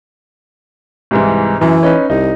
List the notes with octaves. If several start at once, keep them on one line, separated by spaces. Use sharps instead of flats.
C2 G#2 E3
F#2 E3
C#4 D#4 B4
C2 D#4